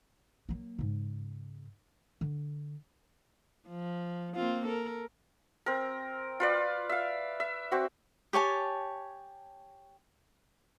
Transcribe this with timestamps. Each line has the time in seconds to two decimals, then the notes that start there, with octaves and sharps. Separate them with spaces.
0.49 F#3 A#3
0.78 G#2 C#3
2.21 D3
3.68 F3
4.35 A#3 C4 F4
4.67 A4 A#4
5.66 C4 A#4
6.40 F4 B4 D5
6.89 E5 F5
7.40 E5
7.72 C4 F#4
8.33 G4 C#5 G#5 A5